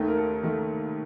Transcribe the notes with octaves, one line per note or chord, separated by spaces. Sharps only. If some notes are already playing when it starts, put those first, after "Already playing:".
Already playing: D#2 D#3 A3
A#4
A4
D#3 A3